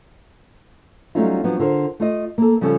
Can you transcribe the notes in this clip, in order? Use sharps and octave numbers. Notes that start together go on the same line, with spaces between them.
F#3 G3 A3 C#4 D#4 F4
F3 F#3 B3 D4
D3 F4 A#4 C5
A3 F4 D#5
A#3 A4
C#3 F3 G3 C#4 A4